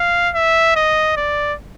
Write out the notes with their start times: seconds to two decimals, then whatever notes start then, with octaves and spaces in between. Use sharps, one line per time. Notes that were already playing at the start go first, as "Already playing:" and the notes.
Already playing: F5
0.35 E5
0.76 D#5
1.17 D5